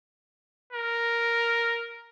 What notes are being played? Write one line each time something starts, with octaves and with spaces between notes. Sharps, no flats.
A#4